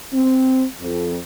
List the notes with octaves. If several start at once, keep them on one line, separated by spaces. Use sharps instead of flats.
C4
F2